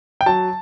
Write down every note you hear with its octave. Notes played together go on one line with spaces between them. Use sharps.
G5
F#3 A5